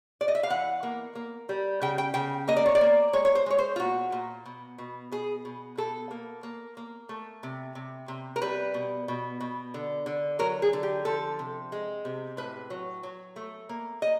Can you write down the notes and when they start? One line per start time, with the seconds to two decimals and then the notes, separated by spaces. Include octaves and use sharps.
0.21 D5
0.28 D#5
0.35 E5
0.43 F5
0.50 E3 F#5
0.83 A#3
1.15 A#3
1.49 G3
1.82 C#3 G5
1.98 G5
2.14 C#3 G5
2.48 A#3 D#5
2.56 D5
2.66 C#5
2.75 D5
2.81 A#3
3.13 G#3 C#5
3.25 C#5
3.35 C5
3.46 G#3 C#5
3.58 C5
3.76 F4
3.80 A#2 F#4
4.12 A#2
4.46 B2
4.78 B2
5.12 B2 G#4
5.45 B2
5.77 B2 A4
6.11 A#3
6.43 A#3
6.77 A#3
7.09 A3
7.43 C3
7.75 C3
8.08 C3
8.36 A#4
8.42 G3 B4
8.74 B2
9.08 B2
9.40 B2
9.74 D3
10.06 D3
10.39 F#3 A#4
10.62 G#4
10.73 D3
10.83 G4
11.05 F3 A4
11.39 C3
11.72 G#3
12.05 C3
12.37 A2 B4
12.70 F#3
13.03 F#3
13.36 A3
13.69 A#3
14.02 A#3 D#5